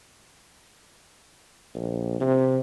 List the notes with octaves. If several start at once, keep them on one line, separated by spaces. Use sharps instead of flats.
A#1
C3